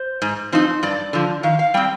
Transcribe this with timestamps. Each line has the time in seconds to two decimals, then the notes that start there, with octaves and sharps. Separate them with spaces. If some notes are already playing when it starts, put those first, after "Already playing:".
Already playing: C5
0.22 G#2
0.52 F3 C4 D#4
0.83 G2 D5
1.13 D3 F3
1.43 D#3 F5
1.59 F5
1.74 G3 C4 G5